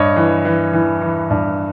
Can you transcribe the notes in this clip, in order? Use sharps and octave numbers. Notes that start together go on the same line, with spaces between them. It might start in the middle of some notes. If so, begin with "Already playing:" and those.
Already playing: G2 C#5 D#5
E3
E3
E3
E3
G2